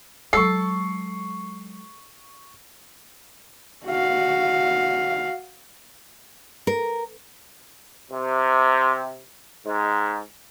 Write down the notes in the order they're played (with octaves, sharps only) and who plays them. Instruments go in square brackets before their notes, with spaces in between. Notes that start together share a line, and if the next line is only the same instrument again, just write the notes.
[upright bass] F#3 G#3 [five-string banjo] A4 [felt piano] C#6 C7
[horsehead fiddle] F#4 F5
[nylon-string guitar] A#4
[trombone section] C3
G#2